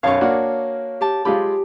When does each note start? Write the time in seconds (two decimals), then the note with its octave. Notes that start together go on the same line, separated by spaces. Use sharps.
0.03 B1 F#2 C#5 F5 A5 C#6
0.21 A#3 D4 F#4
1.01 G4 A5
1.25 G#3 F4 G4 B5